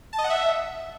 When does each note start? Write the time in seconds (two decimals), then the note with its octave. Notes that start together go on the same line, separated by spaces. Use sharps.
0.13 A5
0.18 D#5
0.24 F#5
0.30 E5